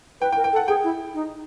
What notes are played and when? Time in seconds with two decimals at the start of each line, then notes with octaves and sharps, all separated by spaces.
0.21 B4 G5
0.32 G5
0.37 A#4
0.44 G5
0.53 A4
0.56 F#5
0.68 G#4 G5
0.84 E4
1.14 D#4